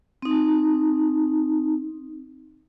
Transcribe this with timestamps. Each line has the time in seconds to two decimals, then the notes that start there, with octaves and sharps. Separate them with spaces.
0.22 C4 D#4